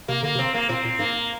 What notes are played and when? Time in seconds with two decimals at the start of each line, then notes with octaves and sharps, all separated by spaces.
0.08 C3 A#3
0.23 D3 A#3
0.35 C3 C4
0.54 A#3
0.69 A#2 C4
0.85 A#2
0.99 G#2 A#3